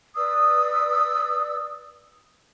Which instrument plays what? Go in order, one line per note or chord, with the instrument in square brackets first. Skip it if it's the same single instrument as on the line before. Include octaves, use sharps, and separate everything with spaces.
[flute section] B4 D5 D#6 E6